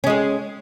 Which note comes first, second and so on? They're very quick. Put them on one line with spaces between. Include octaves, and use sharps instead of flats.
C#4 G#3 G#4